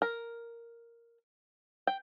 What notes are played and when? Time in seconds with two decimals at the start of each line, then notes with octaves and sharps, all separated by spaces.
0.02 A#4
1.87 G5